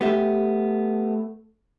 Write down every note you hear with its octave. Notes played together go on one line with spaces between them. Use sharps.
A3 B3 G4 E5